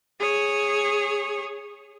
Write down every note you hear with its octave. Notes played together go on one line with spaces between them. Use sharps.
G#4 C#5